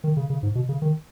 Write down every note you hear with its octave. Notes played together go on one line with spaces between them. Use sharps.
D#3
C#3
C#3
G#2
B2
C#3
D#3